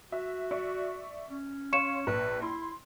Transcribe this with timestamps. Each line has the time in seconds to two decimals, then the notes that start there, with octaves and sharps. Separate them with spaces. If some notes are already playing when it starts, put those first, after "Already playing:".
0.12 F#4 E5
0.51 D5 E5 C#6
1.30 C#4
1.73 C#5 F5 C6 C#6 C#7 E7
2.07 A#1 B4
2.42 E4 C6